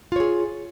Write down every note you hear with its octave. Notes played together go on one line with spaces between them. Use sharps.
F4 G#4 C#5